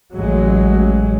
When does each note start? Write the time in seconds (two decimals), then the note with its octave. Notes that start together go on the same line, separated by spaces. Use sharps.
0.14 A1 F#3 G#3